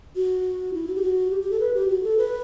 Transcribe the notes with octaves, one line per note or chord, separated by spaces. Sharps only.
F#4
E4
F#4
G4
F#4
G4
G4
A4
B4
G4
F#4
A4
B4